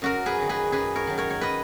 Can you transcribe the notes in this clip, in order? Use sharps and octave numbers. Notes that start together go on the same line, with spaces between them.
F#2 F#4 A#4
G#4 B4
D#3 F#3
G#4 B4
F#2 G#4 B4
A#4 C#5
D#3 F#3
A#4 C#5
C#5
B4 D#5